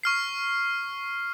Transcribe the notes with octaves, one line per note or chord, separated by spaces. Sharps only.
C#6 F6 C7